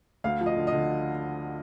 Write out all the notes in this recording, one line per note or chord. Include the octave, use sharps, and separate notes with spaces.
D2 F5
F3
D#5
D3
D#5
D3